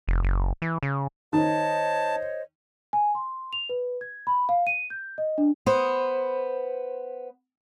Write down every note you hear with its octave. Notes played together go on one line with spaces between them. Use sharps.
F1
F#1
E3
C#3
D#3 C5 C#5 D#5 A5
G#5
C6
F7
B4
G#6
B5
F5
D#7
G6
D#5
D4
B3 C5